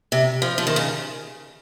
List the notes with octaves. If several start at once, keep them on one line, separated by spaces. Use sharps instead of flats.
C3
F3
F3
D#3
C#3